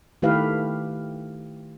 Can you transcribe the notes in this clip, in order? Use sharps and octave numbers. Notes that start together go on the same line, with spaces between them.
D#3 A3 E4 G4 B4 F5